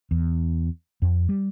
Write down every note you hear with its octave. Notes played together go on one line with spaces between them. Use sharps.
E2
F2
G3